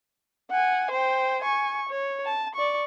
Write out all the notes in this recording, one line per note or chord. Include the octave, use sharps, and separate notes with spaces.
F#5 G#5
C5 G5
G#5 C#6
C#5
A5
D5 C#6